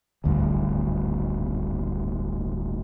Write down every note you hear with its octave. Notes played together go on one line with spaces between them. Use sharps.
D1 G#1 D2 G2